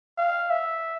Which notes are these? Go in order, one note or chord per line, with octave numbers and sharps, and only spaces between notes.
F5
E5